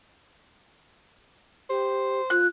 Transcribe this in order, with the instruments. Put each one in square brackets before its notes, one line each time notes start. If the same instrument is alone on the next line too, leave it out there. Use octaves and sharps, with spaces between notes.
[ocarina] G4 [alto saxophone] C5
[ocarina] F4 [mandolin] F#6